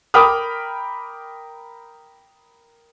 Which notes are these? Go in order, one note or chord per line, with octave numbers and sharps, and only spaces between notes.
A#4 G5 B5 D6 D#6 F6